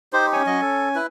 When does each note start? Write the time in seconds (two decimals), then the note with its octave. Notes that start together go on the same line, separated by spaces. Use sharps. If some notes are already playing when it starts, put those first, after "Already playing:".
0.13 D#4 G4 C5
0.33 C#4 C#5 G#5
0.46 F#3 D#5
0.62 A4
0.95 E4 B4